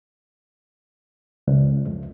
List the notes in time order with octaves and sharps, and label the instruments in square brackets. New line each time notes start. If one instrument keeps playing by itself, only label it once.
[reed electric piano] C#2
F2